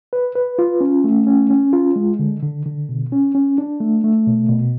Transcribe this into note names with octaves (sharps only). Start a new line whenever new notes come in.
B4
B4
F4
C#4
A3
C#4
C#4
F4
G#3
D3
D3
D3
B2
C#4
C#4
D4
A3
A3
B2
B2